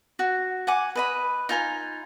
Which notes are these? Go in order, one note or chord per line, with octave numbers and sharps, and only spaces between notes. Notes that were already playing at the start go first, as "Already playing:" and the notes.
F#4
F#5 G#5 D6
B4 D#5 B5
D#4 F4 G#5 A#5